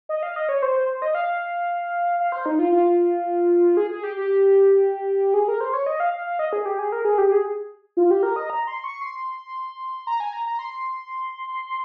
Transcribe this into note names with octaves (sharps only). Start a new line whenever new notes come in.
D#5
F5
D#5
C#5
C5
C5
C5
D#5
F5
F5
C5
D#4
F4
F4
G#4
G#4
G4
G4
G#4
A#4
C5
C#5
D#5
F5
F5
F5
D#5
G#4
G4
G#4
A#4
G#4
G4
G#4
F4
G4
A#4
D#5
A#5
C6
C#6
C6
A#5
G#5
A#5
A#5
C6